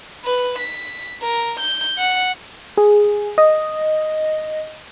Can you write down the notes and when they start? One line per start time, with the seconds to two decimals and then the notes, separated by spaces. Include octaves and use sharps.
0.25 B4
0.58 B6
1.22 A#4
1.60 G6
1.98 F#5
2.77 G#4
3.38 D#5